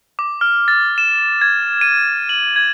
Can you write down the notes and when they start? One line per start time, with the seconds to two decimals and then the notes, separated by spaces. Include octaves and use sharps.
0.19 D6
0.41 F6
0.68 A6
0.98 E7
1.41 G#6
1.81 D#7
2.29 F#7
2.56 G#6